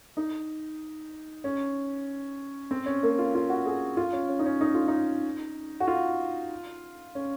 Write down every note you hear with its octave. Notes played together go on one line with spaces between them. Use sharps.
D#4
C#4
C4
C#4
A#3
F4
F4
F#4
G#4
F4
C#4
C#4
D#4
C#4
D#4
F4
D#4
F#4
F4
C#4